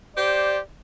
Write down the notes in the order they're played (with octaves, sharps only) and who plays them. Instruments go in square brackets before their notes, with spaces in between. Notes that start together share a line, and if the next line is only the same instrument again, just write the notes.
[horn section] G4 C5 [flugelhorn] D5